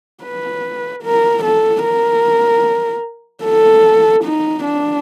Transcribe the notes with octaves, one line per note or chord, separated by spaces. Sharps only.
B4
A#4
A4
A#4
A4
D#4
D4